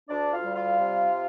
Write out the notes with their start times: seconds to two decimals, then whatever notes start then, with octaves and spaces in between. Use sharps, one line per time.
0.09 D2 D4 D5
0.32 F4 F5
0.44 G3
0.56 F4 F5
0.78 C3